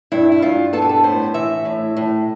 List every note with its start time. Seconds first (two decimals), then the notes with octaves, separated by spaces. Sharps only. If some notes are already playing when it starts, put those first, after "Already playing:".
0.12 G2 E4
0.32 E4
0.42 G2 F4
0.73 B3 A4
0.82 G4
0.89 A4
1.04 A2 C5
1.34 E3 E5
1.65 A2
1.97 A2